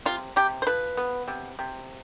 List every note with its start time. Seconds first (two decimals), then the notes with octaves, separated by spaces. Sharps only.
0.06 C3 F4
0.36 C3 G4
0.62 C5
0.67 F3 B4
0.97 B3
1.28 C3
1.59 C3